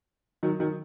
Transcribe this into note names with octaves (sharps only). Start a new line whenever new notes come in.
D#3 F#3
D#3 F#3